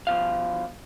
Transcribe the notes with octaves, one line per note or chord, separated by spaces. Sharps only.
B2 F3 F5